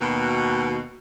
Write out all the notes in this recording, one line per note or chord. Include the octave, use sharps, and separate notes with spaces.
D#2 B2